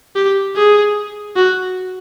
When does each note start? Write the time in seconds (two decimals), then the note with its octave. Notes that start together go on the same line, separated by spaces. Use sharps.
0.16 G4
0.56 G#4
1.36 F#4